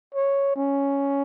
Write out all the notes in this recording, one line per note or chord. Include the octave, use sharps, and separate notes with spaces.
C#5
C#4